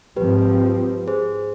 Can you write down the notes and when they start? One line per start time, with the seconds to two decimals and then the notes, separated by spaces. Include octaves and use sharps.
0.16 G#2 F3 C4 G4 B4
1.08 G#4 C5